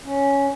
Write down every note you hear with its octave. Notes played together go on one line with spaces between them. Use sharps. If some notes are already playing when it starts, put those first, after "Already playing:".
C#4